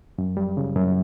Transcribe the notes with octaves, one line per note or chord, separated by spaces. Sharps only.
F#2
G3
C#3
F#2